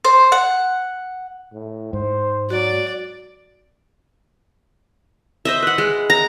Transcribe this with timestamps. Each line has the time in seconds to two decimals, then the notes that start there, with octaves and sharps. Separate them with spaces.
0.05 C5
0.32 F#5
1.53 A2
1.93 G#2 C5
2.50 F#3 F#4 D5
5.45 C5 D#5 E5
5.62 B4 F#5
5.78 G#3
6.10 A#5